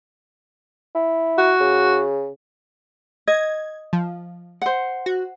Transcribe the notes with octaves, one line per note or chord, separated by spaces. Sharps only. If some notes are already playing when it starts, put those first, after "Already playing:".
E4
F#4
C#3
D#5 G#6
F3
C5 F#5
F#4